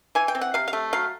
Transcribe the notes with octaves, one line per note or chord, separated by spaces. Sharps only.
E3 G#5
G5
C4
F#5
C3 F5
F5
A3
F#3 F5